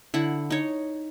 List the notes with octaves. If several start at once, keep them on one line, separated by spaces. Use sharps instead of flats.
D3 E4 F#5
D#4 C#5